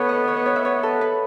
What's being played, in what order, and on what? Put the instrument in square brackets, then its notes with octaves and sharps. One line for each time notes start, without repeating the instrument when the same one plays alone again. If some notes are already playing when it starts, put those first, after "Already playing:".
Already playing: [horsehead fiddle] B3 [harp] A4 B4 C#5
[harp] D#5
C#5
D#5
C#5
E5
C#5
A4
B4